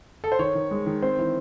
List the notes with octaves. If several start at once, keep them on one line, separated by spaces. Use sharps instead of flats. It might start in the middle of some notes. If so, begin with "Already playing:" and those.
A4
C5
D#3 C#5
D#3
G#3
D#3
C4 C5
E3